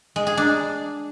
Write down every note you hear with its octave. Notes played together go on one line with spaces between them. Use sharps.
G#3
G#4
D4